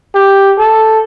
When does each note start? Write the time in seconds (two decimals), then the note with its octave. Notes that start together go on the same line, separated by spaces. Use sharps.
0.15 G4
0.59 A4